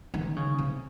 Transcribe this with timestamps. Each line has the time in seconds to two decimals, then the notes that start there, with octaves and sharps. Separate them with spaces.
0.14 D#3
0.36 C#3
0.58 C3